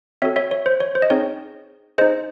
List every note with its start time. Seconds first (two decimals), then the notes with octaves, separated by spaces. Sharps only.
0.22 C4 F#4 A4 C#5 E5
0.36 C#5 E5
0.51 C#5
0.66 C5
0.80 C#5
0.95 C5
1.02 D#5
1.10 C4 D#4 G#4 C#5
1.98 D#4 G#4 C5 D#5